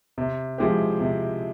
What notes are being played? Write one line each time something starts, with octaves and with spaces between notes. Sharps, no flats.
C3
F3 G#3 E4 G4
C3